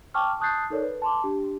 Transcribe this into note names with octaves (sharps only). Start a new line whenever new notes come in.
G5 A5 C#6 D6 F6
A5 D#6 F#6 G6 A6 C7
D#4 A4 A#4 C#5 D5
B4
A5 C6 D6
D4 G4